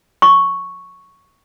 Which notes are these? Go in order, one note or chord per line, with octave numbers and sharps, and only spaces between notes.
C#6